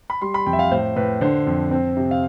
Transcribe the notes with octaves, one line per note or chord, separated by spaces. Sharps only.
B5
G3 C6
B5
F2 G5
E5
F5
A2 C5
A2 B4
D3 C5
F2
C4
C3
F5